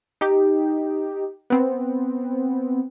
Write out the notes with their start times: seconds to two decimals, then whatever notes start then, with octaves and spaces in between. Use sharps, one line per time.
0.21 D#4 G4
1.50 B3 C4